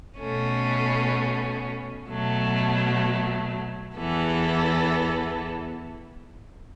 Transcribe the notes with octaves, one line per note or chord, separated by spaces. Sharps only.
B2 A3 C#4
B2 F#3 A3
E2 E3 B3 A4